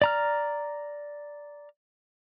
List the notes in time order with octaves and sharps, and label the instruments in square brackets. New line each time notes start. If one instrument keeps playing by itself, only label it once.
[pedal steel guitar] D5 A#5 F6